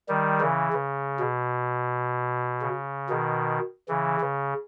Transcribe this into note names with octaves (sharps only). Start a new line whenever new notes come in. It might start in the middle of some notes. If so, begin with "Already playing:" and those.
D#3 G3
C#3 E3
C#3
B2
C#3
B2 D#3
C#3 E3
C#3